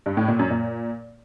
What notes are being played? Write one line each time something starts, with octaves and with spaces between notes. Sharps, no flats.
G2
A2
A#2
F#2
A#2